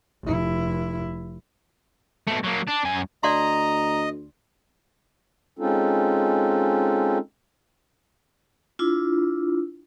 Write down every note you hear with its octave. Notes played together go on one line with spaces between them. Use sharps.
F1 E4
B2 A3
F#3 A#3
D4
F#2 G#5
D2 D5 D#5 F#5 A#5 C6
G#3 C4 C#4 D#4 F4 A4
D4 E4 F4